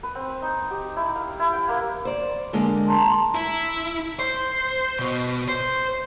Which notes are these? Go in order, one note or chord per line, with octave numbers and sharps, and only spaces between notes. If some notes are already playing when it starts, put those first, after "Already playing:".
B4
C4
D#4
G4
E4
F5
E4
G5
A#3
C5 D5
D3 G#3 A#3
A5 A#5 C6
E4
C5
B2
C5